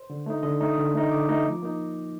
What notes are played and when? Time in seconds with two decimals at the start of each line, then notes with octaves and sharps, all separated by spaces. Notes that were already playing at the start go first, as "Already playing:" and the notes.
Already playing: C5
0.10 D3
0.26 A3 D#4
0.43 D3 D#5
0.60 A3 D#4
0.67 D#6
0.78 D3
0.94 A3 D#4
1.11 D3 D6
1.29 A3 D#4
1.46 F3
1.63 A#3 D#4